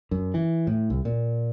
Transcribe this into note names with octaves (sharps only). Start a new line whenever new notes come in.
F#2
E3
A2
C2
A#2